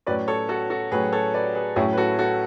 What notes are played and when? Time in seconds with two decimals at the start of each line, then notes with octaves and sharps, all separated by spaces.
0.06 A2 F#3 C#4 B4 D5
0.28 A4 C#5
0.49 F#4 A4
0.70 F#4 A4
0.91 A2 F#3 C#4 G#4 B4
1.12 A4 C#5
1.34 B4 D5
1.55 G#4 B4
1.76 A2 F#3 C#4 E4 G#4
1.93 B4
1.97 F#4 A4
2.19 F#4 A4